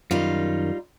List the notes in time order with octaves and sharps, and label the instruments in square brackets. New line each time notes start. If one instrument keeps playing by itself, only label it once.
[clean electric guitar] F#2 D#3 [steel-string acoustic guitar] G3 D#4 F4